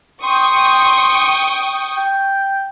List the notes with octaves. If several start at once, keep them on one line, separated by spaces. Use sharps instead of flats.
G5 C6 C#6 D#6
G5